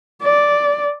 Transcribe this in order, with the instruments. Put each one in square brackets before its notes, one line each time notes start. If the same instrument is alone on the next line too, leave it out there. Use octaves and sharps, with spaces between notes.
[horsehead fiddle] D5